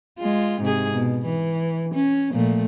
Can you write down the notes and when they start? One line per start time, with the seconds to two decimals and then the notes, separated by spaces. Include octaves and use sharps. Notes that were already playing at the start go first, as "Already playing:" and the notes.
0.19 G#3 F4
0.61 G#2 C3 G#4
0.94 B2
1.26 E3
1.94 C#4
2.32 A#2 F3 A3